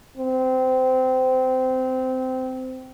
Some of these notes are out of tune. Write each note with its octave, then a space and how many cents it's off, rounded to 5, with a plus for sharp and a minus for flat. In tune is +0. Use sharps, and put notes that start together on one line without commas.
C4 -20